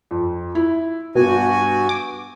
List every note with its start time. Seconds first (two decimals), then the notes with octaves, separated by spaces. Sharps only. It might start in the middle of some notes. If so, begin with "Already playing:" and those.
0.11 F2
0.55 E4
1.15 G2 B2 B3 F#4 G#5
1.89 D6